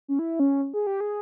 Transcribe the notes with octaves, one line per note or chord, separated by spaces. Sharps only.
C#4
E4
C#4
G#4
G4
G#4